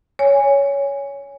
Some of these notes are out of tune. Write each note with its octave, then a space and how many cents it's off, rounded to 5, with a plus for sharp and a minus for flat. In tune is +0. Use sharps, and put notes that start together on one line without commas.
C#5 +15 G#5 -10